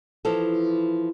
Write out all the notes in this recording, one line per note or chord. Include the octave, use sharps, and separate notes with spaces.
E3 F3 E4 A4